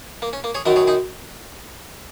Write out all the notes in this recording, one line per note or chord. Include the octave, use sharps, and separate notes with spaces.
A#3
C#4
A#3
G#4 C#5
F#2 D#3 F#3 A#4 D#5
G#4 C#5
D#4 G#4